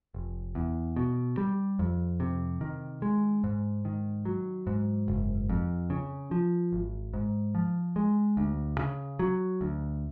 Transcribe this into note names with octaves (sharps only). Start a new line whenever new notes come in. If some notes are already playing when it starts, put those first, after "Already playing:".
F1
E2
B2
G3
F2
C3
D#3
G#3
G#2
D#3
F#3
G#2
F#1
F2
C#3
F3
G#1
G#2
F3
G#3
D2
C#3
F#3
D2